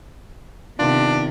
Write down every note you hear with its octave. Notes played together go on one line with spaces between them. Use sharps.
C3 D#3 B3 D4 F4